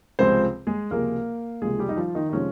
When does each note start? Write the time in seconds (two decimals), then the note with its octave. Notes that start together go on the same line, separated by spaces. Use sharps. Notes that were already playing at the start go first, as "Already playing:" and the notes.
0.19 C#2 C3 F3 G#3 C4 C5
0.67 G#3 G#4
0.91 C#2 C3 F3 G#3 A#3 A#4
1.62 C#2 C3 F3 G#3 G#4
1.79 G3 G4
1.89 D#4
1.97 F3 F4
2.15 D#3 D#4
2.29 D#4
2.33 C3 F3 G#3 C#4